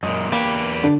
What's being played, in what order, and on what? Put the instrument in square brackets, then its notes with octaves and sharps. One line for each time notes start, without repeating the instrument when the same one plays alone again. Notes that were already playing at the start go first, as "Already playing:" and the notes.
[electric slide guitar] F#2 A#2 [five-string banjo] G#3
[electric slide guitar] E2 G4 B4 [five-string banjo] A#3
[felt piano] D3 [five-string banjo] D4